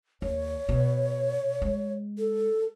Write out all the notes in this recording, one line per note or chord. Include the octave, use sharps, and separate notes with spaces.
D#2 C#5
B2
G#3
A4